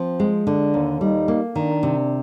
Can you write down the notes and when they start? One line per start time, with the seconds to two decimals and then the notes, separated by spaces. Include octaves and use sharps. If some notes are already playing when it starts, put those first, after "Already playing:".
Already playing: F3 C4
0.20 G#3
0.47 D3 D4
0.74 D#2
1.01 G3 D#4
1.28 A#3
1.55 D#3 D4
1.83 C3